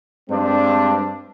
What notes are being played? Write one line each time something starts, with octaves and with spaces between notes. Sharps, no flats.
G2 G#3 C4 D4